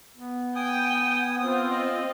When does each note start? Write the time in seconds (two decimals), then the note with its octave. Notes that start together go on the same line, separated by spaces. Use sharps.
0.17 B3
0.56 G5 G#5 D#6
1.40 C4 F4 D#6
1.71 D#5